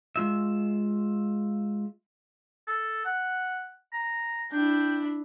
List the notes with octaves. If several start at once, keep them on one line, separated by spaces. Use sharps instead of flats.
G#3 F4 E5
A4
F#5
A#5
D4 E4 G5